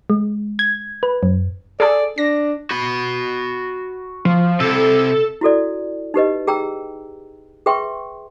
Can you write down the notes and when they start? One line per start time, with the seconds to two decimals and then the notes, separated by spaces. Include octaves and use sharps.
0.10 G#3
0.59 G#6
1.03 B4
1.23 F#2
1.80 G#4 A4 D5
2.18 D4 A#6
2.71 F#4 B5
4.25 F3
4.60 C3 E4 A4
5.41 E4 F#4 A4 D5
6.14 D#4 G4 B4 D#5
6.47 G#4 G5 A#5 E6
7.66 G#4 B4 E5 G5 C6 C#6